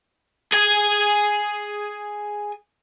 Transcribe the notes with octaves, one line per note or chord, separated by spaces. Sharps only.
G#4 G#5